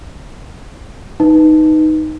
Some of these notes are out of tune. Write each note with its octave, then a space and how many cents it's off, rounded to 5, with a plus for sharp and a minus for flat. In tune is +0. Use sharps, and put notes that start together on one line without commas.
D#4 +0 B4 +0